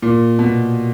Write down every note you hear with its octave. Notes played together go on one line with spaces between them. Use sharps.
A#2
B2